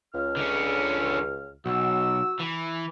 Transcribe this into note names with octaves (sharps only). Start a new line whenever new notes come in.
C#2 F6
D3 C#4
B1 F#4 E6
E3